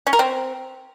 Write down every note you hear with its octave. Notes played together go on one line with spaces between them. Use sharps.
C#4
A#4
C4